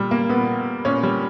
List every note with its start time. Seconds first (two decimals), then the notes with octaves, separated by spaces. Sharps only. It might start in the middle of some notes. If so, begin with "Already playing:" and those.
Already playing: A#2 G3
0.11 A#3
0.29 A#2 B3
0.85 A#2 C#4
1.03 G3